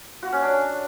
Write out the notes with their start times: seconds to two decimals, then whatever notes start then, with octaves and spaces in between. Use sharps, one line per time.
0.23 F#4
0.32 C#4
0.42 D4